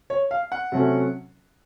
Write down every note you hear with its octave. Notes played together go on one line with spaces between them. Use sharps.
C#5
F5
F#5
C3 F#3 A3 C#4